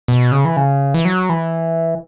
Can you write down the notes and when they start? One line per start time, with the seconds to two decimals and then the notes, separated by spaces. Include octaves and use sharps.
0.08 B2
0.32 C#3
0.45 E3
0.57 C#3
0.94 E3
1.05 F#3
1.29 E3